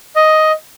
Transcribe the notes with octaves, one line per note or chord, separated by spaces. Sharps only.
D#5